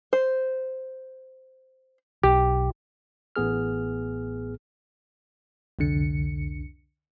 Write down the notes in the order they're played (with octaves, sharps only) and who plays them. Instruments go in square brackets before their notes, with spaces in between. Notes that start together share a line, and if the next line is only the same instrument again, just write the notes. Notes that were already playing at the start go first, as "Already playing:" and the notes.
[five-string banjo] C5
[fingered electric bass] B1 [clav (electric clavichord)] G4
[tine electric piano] A1 A2 B3 G#4 F6
[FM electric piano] C2 F2 D3 C#7